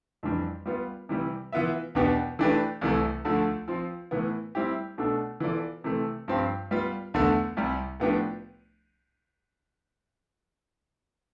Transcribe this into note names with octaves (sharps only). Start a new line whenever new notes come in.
F2 E3 G3 D4
G3 B3 F4
C3 E3 G3
E3 B3 F4 B4 E5
E2 B2 B3 D4 G4
E3 A3 D4 G4 B4
C2 C3 E3 A3
D2 D3 F3 A3
F3 C4 F4
A2 E3 B3
G3 C4 E4 G4
B2 A3 D4 A4
E3 B3 F4 A4 D5
C3 E3 A3
G2 F3 C4 G4
G3 B3 F4
E2 D3 A3
C2 C3 G3
A2 F3 B3 D4 G4